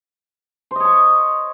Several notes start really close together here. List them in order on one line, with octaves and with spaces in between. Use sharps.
C5 D#5 C#5 C#6